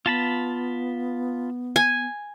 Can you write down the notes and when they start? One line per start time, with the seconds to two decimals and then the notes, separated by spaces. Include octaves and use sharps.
0.06 B3 F4 A5 B5
1.76 G#5